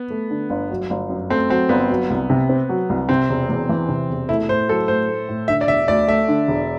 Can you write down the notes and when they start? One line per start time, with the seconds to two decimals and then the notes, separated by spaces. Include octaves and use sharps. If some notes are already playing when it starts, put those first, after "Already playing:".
Already playing: B3
0.10 A3
0.30 D3
0.50 G1
0.70 F#3
0.90 G1
1.09 F#2
1.30 A3 C4
1.50 F#3 C4
1.69 G1 B3
1.90 F#3
2.10 C2
2.30 C3
2.49 C4
2.69 F#3
2.89 C2
3.09 C3 C4
3.29 E1
3.49 E2
3.69 E3
3.89 C3
4.09 E1
4.29 A3 E4
4.49 A2 C5
4.68 F#3 A4
4.88 A2 C5
5.08 A3
5.28 A2
5.48 D3 E5
5.61 D5
5.68 E1 E5
5.88 D2 D5
6.08 A3 E5
6.28 D3
6.48 E1